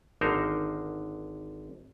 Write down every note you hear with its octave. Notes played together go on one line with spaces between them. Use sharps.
G#1 D3 D#4 A#4 C5